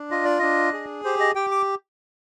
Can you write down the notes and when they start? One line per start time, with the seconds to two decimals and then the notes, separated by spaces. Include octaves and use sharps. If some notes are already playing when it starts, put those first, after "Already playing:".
Already playing: D4
0.11 F4 D#5
0.25 D5
0.39 D4 D#5
0.73 G#4
1.04 G4 C5
1.20 D#5
1.35 G4 G5
1.51 D6